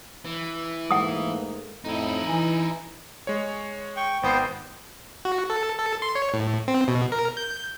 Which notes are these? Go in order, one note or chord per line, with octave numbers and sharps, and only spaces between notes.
E3
G#2 A3 A#3 F#5 D#6
F2 A2 D#4 E4
E3 G#5
G#3 C#5
G5 C#6
G#1 B3 C5 G5 D#6 C7
F#4
A4
A4
C6
C#5
A2
C4
B2
A#4
G6